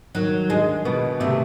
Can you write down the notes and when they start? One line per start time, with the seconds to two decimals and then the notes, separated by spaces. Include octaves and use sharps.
0.15 D#3 F#3
0.50 D3 G#3
0.85 B2 B3
1.20 C3 A3